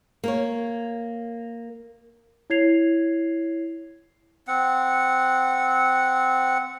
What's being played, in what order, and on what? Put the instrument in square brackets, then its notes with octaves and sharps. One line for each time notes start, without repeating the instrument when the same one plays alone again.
[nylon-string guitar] A#3 A#4 C#5
[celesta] E4 C#5 G#6 C7 F7
[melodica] C4 F#5